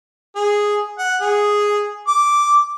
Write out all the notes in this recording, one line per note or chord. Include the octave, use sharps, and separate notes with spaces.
G#4
F#5
G#4
D6